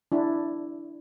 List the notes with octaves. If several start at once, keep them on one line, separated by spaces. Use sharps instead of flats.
D4 E4